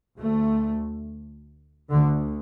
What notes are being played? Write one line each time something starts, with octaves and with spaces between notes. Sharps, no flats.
D2 A3
D2 D3